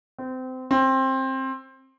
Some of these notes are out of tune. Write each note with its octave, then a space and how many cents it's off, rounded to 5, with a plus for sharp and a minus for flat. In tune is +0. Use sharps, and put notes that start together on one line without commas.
C4 -25
C4 +20